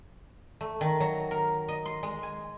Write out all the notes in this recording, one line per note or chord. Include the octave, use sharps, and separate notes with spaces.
A3
D#3
F#3
A#4
D#5
C6
G#3
G#5